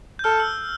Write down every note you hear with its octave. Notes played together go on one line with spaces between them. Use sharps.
G6
A4 F6
E6